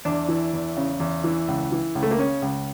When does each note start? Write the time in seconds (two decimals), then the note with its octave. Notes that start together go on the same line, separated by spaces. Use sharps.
0.05 E2 D4
0.28 E3
0.53 E2
0.77 C#3
1.00 E2
1.24 E3
1.48 C#2
1.72 E3
1.95 C#2
2.03 A3
2.11 A#3
2.19 C#3 C#4
2.42 C#2